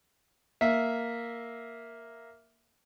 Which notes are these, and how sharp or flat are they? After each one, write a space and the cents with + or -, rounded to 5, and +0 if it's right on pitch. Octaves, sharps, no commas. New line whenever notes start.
A#3 +0 E5 +0